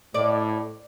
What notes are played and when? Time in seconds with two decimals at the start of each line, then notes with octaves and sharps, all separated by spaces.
0.14 A2 D5